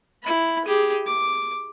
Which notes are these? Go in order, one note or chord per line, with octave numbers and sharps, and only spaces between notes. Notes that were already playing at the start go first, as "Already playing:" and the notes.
E4 B5
G4 G#4
D6